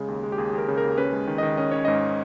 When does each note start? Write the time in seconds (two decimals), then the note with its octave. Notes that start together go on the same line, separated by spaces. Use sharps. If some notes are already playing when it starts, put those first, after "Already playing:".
Already playing: C#3 G#3
0.08 D#2
0.23 G#3
0.32 G4
0.38 D#2 G#4
0.53 D#2
0.58 A#4
0.68 C#3
0.78 A#4
0.83 D#2
0.98 C#4 B4
1.13 G#3
1.27 D#3
1.38 D#3 D#5
1.57 C#4 D#5
1.71 C#4 C#5
1.85 G#2 D#5